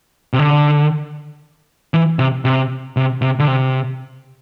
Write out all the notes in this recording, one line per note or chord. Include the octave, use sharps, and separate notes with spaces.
C3
D3
E3
C3
C3
C3
C3
D3
C3